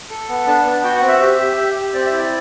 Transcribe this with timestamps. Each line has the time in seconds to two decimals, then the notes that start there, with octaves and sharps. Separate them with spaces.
0.10 A4
0.29 B3
0.47 D4 A5
0.65 B3
0.83 F#4 G5
0.96 F#5
1.02 C4
1.08 E5
1.21 G4
1.39 G4
1.57 G4
1.75 G4
1.94 C4 D5
2.06 E5
2.12 E4
2.18 D5